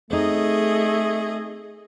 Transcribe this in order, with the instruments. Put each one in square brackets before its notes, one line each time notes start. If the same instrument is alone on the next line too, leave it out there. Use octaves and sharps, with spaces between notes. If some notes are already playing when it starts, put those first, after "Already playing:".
[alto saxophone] A3 [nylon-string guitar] C4 D#4 [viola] G#4 D#5